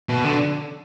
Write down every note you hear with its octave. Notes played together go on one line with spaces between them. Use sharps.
B2
D3